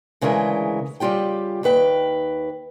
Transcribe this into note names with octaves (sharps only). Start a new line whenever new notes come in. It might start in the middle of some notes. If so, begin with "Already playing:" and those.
D2 C#3 E3 G#3 A#4 E5
C#3 G3 F4 G4 G5
D#2 D#3 B4 G5